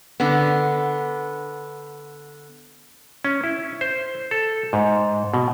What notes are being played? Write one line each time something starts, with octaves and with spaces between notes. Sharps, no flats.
D3 B3
C#4
E4
C5
A4
G#2
B2